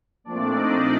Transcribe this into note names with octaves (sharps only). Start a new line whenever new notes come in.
A#2 F3 A3 C4 D4 D5
D#4 D#5